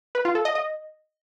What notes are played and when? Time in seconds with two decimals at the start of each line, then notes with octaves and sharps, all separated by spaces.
0.15 B4
0.25 F4
0.35 A4
0.45 D#5
0.55 D#5